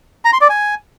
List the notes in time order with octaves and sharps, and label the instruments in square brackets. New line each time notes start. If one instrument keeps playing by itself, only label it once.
[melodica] A#5
C6
D5
G#5